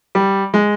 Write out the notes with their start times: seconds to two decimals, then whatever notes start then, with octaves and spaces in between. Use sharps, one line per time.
0.15 G3
0.54 G#3